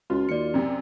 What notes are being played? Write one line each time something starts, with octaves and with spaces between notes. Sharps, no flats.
C#2 F4 F#4
D#2 D5 C#7
F#2 C3